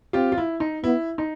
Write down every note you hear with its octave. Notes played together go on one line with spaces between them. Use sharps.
C4 F4 G4
F4
E4
D#4
B3 E4
D#4